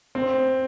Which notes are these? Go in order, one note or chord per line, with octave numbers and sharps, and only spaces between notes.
C4